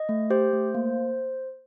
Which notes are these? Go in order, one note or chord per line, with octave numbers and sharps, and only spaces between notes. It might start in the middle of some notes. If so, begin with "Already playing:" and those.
Already playing: D#5
A3
G4 C5
A3
A#3